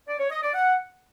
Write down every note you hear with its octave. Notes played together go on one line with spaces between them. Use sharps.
D5
C#5
D#5
D5
F#5